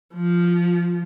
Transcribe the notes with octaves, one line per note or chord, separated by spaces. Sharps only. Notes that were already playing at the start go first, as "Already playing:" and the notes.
F3